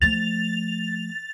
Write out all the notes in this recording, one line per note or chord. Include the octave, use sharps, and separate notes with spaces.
F3 A3 A6 F7